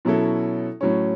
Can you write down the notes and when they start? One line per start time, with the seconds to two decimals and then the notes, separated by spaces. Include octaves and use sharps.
0.05 B2 F#3 C#4 E4 A4
0.81 A2 F#3 C#4